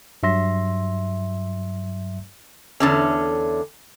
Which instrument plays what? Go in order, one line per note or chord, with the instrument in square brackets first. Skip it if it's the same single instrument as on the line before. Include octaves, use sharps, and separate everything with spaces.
[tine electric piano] G2 F#3 E5 C6 A#6
[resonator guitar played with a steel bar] E2 D3 C#4